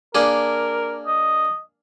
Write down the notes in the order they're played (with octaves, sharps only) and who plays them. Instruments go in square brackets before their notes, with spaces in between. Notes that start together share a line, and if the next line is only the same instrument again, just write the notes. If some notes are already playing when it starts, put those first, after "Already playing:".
[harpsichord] A#3 D4 G#4 [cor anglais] A#4
[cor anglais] D#5